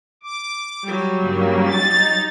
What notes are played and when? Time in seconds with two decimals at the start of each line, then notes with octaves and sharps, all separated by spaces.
0.23 D6
0.84 F#3 G3
1.20 G2 C#3 A#3
1.71 D#4 A6